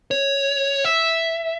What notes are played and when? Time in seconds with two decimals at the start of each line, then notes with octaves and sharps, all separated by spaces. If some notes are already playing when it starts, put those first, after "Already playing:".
0.11 C#5
0.85 E5